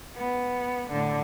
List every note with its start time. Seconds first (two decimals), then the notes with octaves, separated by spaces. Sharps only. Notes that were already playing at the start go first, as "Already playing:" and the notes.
0.16 B3
0.91 A2 D3